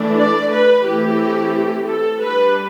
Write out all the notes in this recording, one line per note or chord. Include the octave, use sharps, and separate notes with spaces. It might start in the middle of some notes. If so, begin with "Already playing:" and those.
Already playing: E3 A3 D4
D5
B4
E3 A3 C4 G4
A4
G3 D4 B4